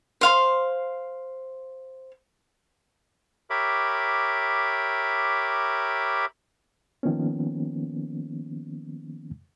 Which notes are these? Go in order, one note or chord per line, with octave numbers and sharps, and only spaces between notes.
C5 F5 C6
G4 A#4 C#5 E5 B5 D6
D#3 F3 A#3 B3 C#4